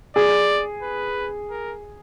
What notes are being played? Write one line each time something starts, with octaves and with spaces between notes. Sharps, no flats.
G#4 D5
B4
A#4